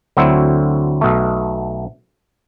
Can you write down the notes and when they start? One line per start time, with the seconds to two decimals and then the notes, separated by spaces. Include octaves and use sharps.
0.17 D2 D3 F#3 C4 E4
1.01 B1 B2 A3